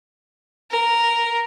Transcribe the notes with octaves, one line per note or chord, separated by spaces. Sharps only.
A#4